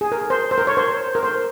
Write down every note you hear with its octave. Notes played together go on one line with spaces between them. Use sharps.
G#4
A#4
C5
C5
A#4
C#5
C5
A#4
C5